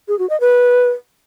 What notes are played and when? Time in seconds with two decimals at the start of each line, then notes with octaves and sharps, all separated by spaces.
0.08 G#4
0.19 F#4
0.30 D#5
0.40 B4